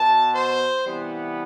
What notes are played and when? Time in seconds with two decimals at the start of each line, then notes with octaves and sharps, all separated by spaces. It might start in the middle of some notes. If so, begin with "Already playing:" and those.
Already playing: B2 B3 A5
0.33 C5
0.86 C3 E3 G3 B3